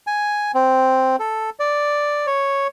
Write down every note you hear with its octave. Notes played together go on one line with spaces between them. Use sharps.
G#5
C4
A4
D5
C#5